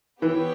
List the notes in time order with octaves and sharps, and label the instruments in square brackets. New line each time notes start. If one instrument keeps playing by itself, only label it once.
[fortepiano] E3 [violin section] B3 G4 C#5 G5